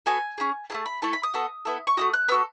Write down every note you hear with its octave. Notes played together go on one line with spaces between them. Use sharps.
B3 F#4 A4 G#5
C#4 E4 G#4
A3 E4 G#4 A5
B5
A3 E4 A4 A5
B5
D#6
B3 F#4 A4
B3 E4 A4
C#6
A3 D#4 F#4 D#6
F#6
B3 F#4 A4 E6